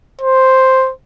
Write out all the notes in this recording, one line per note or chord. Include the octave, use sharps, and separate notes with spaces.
C5